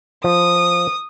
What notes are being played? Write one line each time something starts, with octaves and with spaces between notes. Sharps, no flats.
F3 D#6